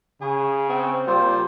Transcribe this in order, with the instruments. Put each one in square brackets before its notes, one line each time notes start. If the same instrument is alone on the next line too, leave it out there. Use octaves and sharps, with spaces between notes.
[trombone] C#3 [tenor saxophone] G#4
[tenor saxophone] C4
[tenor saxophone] G3 [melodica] A#3 F4 C5